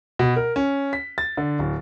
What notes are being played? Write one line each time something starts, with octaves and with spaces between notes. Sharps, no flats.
B2
A#4
C#4
B6
A6
D3
D1